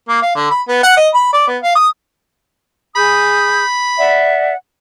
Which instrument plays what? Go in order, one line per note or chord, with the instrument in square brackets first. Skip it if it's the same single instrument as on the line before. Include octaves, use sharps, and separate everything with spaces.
[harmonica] A#3
F5
D3
B5
B3
F#5
D#5
B5
D5
B3
F5
D#6
[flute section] G#4 D#6 G6 [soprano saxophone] B5
[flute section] D5 E5 F#5